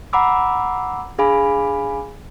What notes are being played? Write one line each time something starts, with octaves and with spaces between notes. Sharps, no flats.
F#5 A#5 B5 D6 E6
D4 G#4 F5 G#5 B5